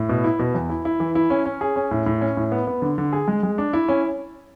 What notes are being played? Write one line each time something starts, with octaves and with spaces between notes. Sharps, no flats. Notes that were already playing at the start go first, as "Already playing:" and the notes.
Already playing: A2
B2
E4
B2
E2
E4
E4
E3
E4
C#4
C#4
G#4
C#4
A2
A2
C#4
A2
B3
B3
D3
D3
G#4
G#3
G#3
D4
E4
C#4